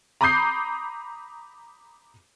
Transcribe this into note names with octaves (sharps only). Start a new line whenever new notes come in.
A#5 B5 D6 D#6 G6 C7